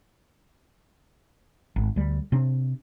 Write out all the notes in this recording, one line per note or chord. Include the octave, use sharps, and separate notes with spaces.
G#1
D2 G3
C3 C4 D4